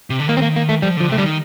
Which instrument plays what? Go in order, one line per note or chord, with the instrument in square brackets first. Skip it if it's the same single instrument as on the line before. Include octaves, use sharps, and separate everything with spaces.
[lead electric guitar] C3
D3
[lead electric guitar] D#3 [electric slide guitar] A#3
[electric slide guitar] C4
A#3
A#3
A3
[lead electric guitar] F3 [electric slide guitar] G3
[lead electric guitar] D3 [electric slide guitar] F3
[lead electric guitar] C3 [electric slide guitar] A3
[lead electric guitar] D3 [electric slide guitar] G3
[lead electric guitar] D#3